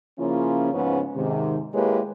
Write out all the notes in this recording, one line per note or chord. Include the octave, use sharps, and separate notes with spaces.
C#3 F3 A#3 C#4 E4 F4
G#2 C#3 F3 B3 C#4
G#2 C3 D#3
G#3 A#3 E4 G4 B4 C#5